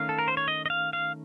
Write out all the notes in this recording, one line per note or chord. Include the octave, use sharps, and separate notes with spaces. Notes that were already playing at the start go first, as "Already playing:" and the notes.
Already playing: D#3 A3 C#4 F5
A4
A#4
C5
C#5
D#5
D#5
F5
F5